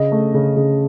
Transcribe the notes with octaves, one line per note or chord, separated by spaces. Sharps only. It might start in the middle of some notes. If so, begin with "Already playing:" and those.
Already playing: C#3 D#5
A3
C#3
C#3